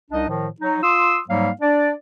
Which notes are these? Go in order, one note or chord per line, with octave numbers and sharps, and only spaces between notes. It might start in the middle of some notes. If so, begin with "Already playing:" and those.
C2 D4 D#4 D#5
A2 D#3 F3
F#3 D#4
F4 C6 D#6 E6
G#2 F#3 G3 A#3 F5
D4 D5